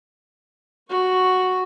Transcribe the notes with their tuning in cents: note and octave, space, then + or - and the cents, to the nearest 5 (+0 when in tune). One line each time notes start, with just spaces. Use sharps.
F#4 +0 C#6 +0